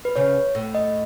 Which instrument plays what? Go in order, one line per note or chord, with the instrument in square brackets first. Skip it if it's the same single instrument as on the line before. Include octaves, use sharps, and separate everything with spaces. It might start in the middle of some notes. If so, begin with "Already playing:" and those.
[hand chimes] B4
[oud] C#3 [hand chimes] C#5
[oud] A2
[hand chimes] D#5